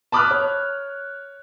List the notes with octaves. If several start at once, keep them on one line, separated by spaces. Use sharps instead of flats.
A5 B5 D6 D#6 F6 F#6
C#5